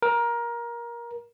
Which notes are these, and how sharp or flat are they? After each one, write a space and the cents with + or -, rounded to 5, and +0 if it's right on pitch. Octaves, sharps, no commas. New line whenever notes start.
A#4 +20